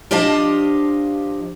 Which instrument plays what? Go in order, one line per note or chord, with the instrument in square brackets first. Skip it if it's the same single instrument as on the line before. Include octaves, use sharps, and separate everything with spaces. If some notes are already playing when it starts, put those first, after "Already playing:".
[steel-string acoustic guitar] F3 D4 G4 D#5 F5 A5